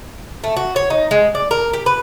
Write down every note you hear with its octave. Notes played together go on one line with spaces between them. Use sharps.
A3
F#4
C#5
D#4
G#3
D5
A#4
G4
B4